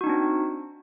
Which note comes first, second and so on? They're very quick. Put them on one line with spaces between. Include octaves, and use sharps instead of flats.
F#4 D#4 D4 C4